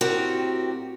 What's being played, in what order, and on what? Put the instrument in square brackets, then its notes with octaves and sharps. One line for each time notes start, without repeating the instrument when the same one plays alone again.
[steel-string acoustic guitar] A2 C4 F#4 G4 A#4 D5